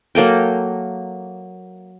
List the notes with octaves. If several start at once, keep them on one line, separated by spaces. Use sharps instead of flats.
F#3 A#3 A4 G5